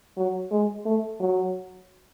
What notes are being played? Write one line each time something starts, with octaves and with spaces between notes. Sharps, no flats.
F#3
G#3
A3
F#3